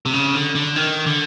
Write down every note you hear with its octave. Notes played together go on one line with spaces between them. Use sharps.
C3
C#3
D3
D3
D#3
D3